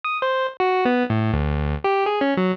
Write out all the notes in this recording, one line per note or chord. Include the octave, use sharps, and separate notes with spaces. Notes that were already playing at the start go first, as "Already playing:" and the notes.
D#6
C5
F#4
B3
A2
D2
G4
G#4
C#4
F#3